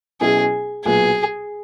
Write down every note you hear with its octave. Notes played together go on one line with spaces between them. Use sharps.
B2 F#3 C#4 E4 G#4
B1 A#2 F#3 B3 G#4